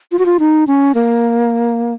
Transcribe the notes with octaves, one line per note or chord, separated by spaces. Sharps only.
F4
F#4
F4
D#4
C#4
A#3